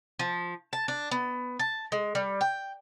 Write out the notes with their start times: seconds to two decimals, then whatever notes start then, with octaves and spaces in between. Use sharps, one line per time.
0.19 F3
0.73 A5
0.88 D4
1.11 B3
1.59 A5
1.92 G#3
2.15 G3
2.41 G5